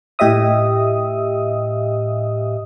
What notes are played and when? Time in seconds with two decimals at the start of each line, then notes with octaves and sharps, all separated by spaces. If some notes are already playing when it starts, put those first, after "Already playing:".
0.19 A2 G4 D#5 E5 D#6